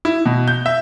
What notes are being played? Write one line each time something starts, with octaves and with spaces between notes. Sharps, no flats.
E4
B2
G6
E5